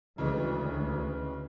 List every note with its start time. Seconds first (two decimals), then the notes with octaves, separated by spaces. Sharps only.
0.18 D2 C#3 E3 G#3